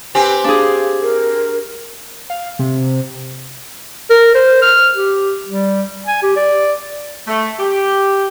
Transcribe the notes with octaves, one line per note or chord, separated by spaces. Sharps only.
C4 G4 B4 G#5
D4 G#4 F5
A#4
F5
C3
A#4
C5
F6
G4
G3
G#5
G4
D5
A3
G4